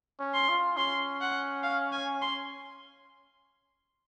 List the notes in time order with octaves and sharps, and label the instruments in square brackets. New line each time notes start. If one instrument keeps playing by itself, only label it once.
[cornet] C#4
[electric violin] C6
[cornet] F4
[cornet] C#4 [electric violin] C6
[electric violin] F#5
F5
G#5
C6